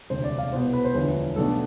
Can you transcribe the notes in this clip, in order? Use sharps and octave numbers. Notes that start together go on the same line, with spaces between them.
E1 D2 C3 C5
D5
F5
C2 B2 B3 C5
B4
C5
E1 D2 D3 F3 B4
B1 B2 A3 D4 A4